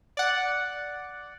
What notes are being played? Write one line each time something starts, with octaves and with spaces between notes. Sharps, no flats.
D5 F#5